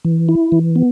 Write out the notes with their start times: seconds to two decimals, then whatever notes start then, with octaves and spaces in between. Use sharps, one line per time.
0.05 E3
0.29 E4
0.52 E3
0.76 B3